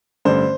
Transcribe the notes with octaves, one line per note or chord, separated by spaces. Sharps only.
A1 G2 D3 C5